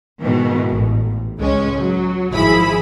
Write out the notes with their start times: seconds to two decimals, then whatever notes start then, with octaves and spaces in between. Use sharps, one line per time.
0.21 G#2 B2 D#3 E3
0.69 A1
1.38 C#2 G#3 C#4
1.78 F#3
2.32 G#1 F3 E4 G#4 B5